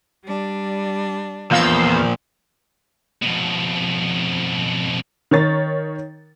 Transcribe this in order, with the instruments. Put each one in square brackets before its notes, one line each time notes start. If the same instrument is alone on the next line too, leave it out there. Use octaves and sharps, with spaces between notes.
[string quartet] G3 D4
[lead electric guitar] E2 [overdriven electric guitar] A#2 F3 [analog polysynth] F5 E6 G6
[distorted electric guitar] F2 B2
[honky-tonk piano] D#3 A#4 C#5 A6